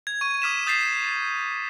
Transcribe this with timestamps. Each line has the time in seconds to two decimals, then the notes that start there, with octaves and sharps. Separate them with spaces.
0.07 G#6
0.21 C#6 D#7
0.42 D6 D#6 F6 B6 D#7 E7
0.66 D#6 G6 A6 B6 C7 E7
1.04 A6